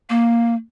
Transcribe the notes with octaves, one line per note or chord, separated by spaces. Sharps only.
A#3